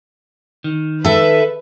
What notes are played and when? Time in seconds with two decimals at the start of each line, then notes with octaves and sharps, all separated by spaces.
0.64 D#3
1.05 A4 B4 E5